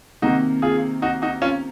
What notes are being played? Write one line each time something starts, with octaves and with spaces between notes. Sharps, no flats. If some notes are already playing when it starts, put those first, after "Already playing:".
C3 D#3 A#3 D#4 F#4
F4 G#4
D#4 F#4
D#4 F#4
C#4 F4